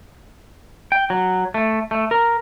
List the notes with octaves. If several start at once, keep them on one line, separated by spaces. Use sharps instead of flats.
G5
F#3
A3
A3
A#4